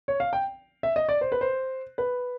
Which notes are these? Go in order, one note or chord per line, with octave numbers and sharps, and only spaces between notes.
C#5
F5
G5
E5
D#5
D5
C5
B4
C5
B4